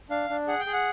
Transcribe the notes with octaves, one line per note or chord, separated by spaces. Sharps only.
D4 F5
D4
G#4 F#5
G5
G#4
F#5